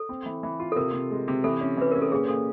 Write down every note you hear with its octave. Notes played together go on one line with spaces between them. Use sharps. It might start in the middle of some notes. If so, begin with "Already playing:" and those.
Already playing: A4
C4
E3
E3
F4
A4
C3 A#4
C3
G#3
C3
E3 A4
C#4
E3 B4
C#4 A#4
A4
A#2 G#4
A#2 A4